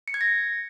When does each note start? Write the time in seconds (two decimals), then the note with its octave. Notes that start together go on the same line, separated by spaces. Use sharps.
0.08 C#7
0.14 G#6
0.21 A#6